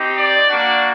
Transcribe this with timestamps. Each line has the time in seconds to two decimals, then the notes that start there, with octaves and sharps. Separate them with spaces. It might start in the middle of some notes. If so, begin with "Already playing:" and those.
Already playing: C4 D#4 G4
0.17 D5
0.47 A#3 D4 F#4